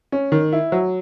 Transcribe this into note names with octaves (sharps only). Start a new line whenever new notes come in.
C#4
D#3
E4
F#3